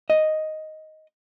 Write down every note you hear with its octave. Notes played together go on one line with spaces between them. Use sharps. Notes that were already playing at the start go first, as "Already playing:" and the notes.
D#5